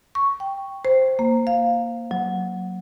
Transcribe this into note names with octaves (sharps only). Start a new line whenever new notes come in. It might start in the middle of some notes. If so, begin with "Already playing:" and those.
C#6
G5
C5
A#3
F5
F#3